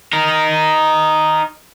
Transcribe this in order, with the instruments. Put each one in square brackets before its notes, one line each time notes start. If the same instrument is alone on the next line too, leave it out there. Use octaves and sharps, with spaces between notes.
[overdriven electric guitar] D#4 A#4